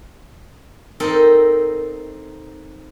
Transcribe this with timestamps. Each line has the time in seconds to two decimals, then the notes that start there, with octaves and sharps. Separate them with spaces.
1.00 C4 D#4 A4 A#4